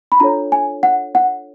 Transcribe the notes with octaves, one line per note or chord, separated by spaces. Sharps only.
B5
D4 F4 A4 C#5 A#5
G#5
F#5
F#5